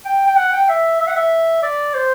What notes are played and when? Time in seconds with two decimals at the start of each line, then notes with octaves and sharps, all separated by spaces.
0.05 G5
0.27 G5
0.36 F#5
0.53 G5
0.68 E5
1.00 E5
1.07 F#5
1.15 E5
1.62 D5
1.94 C5